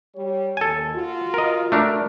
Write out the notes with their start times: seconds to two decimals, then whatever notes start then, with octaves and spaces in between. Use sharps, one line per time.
0.15 G3 G4 C#5
0.57 D#2 A4 G#5
0.94 F4 F#4
1.34 A#4 D#5
1.72 A3 D4 A#4